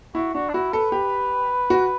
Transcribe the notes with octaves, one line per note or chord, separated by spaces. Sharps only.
E4 F#4
D4 F#4
D4
E4 F#4
A4 B4
G4
F#4